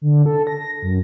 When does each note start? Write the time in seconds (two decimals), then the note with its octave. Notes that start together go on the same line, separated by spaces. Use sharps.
0.01 D3
0.26 A4
0.47 A#6
0.82 F#2